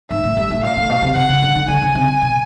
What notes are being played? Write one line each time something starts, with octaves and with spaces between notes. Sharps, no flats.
G#2 E5
A2
G2
A2
A#2 F5
A2
B2
C3
C3 F#5
C#3
D3
D3
D3 G#5
C#3
C3
B2